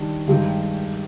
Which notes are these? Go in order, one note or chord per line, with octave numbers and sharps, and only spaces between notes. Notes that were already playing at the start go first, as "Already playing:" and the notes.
Already playing: D#3 G3 D4
G2 D#3 G#3 D#4 G4